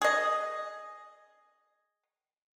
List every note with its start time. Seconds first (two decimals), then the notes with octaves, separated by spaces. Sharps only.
0.02 G#4 D#5